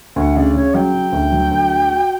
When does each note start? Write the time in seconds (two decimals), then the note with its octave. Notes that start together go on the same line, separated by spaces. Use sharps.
0.16 D2 F#5
0.35 C#3 D5
0.55 C#3 C#5
0.74 F#3 G5
0.94 C#3
1.12 D2
1.32 F#3
1.51 D2
1.71 F#4
1.90 F#4